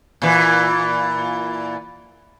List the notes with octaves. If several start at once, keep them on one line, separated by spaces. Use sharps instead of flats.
A#2 E3